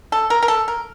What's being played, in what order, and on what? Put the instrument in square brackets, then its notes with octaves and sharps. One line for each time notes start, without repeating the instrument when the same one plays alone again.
[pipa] A4
A#4
A#4
A4
A#4